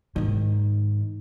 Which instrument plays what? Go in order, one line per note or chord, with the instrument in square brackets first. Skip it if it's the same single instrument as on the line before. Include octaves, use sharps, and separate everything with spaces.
[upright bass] G#2 D#3